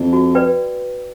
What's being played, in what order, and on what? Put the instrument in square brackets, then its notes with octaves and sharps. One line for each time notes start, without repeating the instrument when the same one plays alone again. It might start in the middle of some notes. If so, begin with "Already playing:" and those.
Already playing: [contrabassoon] F2
[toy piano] F#4
B4 D5 G5